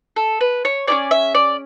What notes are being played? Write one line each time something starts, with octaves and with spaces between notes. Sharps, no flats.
A4
B4
C#5
C#4 E4 G#4 D5
E5
D5